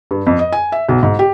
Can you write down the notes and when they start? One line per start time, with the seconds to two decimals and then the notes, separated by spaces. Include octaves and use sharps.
0.11 G2
0.27 F2
0.39 D#5
0.52 G#5
0.72 E5
0.89 B1
1.03 G#2
1.19 G4